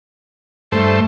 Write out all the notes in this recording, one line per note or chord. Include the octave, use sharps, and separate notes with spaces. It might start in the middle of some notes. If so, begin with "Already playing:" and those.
G2 A3 A4 C5